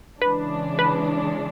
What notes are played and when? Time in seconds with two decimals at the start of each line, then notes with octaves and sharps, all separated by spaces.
0.22 C#3 E3 G#3 D4 B4
0.79 B4